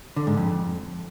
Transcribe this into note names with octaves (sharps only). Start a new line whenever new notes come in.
D3
G#2
F2